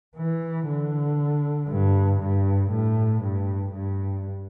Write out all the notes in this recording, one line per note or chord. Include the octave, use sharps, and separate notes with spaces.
E3
D3
G2
G2
A2
G2
G2